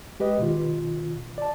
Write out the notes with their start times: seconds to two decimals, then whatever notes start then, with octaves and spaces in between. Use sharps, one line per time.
0.20 G#3 G4 B4 D#5
0.39 B2 D#3 F4
1.38 D5 A5